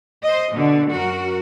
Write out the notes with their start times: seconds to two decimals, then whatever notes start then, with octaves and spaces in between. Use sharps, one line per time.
0.24 C5 D#5
0.52 B2 D3
0.91 F#2 F#4 A#4